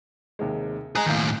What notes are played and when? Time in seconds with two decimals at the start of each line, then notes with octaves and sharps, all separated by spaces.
0.39 D#2 C3 G#3
0.95 G#4 D#5 G#5 A#5 F#6
1.06 D#2 A2 F5 G6